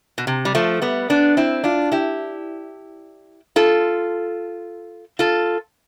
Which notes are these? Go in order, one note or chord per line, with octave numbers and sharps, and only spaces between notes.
B2
C3
G3
F3 A3
G3 B3
B3 D4
C4 E4
D4 F4
E4 G4
F4 A4
F4 A4